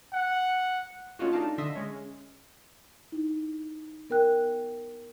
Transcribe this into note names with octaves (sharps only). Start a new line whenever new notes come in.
F#5
A3 C#4 D#4 F4 F#4
A3 D4 D#4 D5 F5 A5
D3 D#5 E5 C6 E6 A#6
G#3 C#4
D#4 E4
B3 A#4 G5 F#6